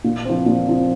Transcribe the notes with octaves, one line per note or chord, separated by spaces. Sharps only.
A#2
F3 C4
A#2
F3 C4